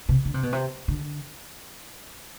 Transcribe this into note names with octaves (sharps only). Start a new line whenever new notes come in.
C3
D3
C3
B2
C3
D3